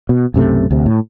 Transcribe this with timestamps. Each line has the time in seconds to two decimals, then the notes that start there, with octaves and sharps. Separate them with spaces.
0.09 B2
0.34 B1 F#2 C3 A3
0.71 D2 C3
0.86 A2